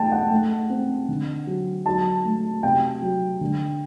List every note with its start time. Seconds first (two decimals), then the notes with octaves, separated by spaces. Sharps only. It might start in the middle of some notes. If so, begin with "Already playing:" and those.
Already playing: A3 G5 A5
0.12 F#5
0.31 A3
0.70 C4
1.09 D3
1.47 F#3
1.86 F#3 A5
2.25 A3
2.63 C3 G5
3.02 F#3
3.41 D3